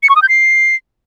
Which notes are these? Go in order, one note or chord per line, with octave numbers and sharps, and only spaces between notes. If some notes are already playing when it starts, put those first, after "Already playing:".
C#7
C#6
D#6
G6
C7